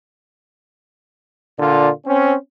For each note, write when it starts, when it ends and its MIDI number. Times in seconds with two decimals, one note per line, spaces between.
1.58 1.89 46
1.58 1.89 50
1.58 1.89 62
1.58 1.89 65
2.06 2.34 60
2.06 2.34 61